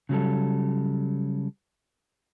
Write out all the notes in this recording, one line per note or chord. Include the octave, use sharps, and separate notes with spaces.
C#3 F#3 G3 A4